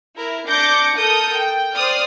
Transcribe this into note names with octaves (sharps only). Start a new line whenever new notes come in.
E4 A#4
D4 D6 G6 A#6 C#7
A4 A#4 D#6 G6
G5
C5 D5 D#6 F6